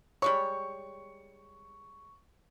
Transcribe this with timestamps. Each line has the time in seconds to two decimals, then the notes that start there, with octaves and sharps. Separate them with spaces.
0.22 G3 G#3 C#5 C#6